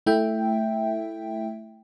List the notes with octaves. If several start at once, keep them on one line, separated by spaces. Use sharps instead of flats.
A3 E4 E5 G5